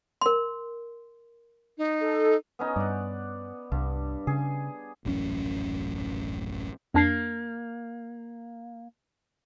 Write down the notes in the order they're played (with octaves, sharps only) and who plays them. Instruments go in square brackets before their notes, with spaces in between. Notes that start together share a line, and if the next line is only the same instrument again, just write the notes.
[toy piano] A#4 C6
[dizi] D#4
[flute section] A4
[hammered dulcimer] B3 C#4 D#4
[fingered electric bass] G2 [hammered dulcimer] D5 F#5
[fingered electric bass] C2 [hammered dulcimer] G2
[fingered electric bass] C#3 [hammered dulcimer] G#4
[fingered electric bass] D#1 A1 F#2 C#4
[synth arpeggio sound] F2 D4 C7 [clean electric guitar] A#3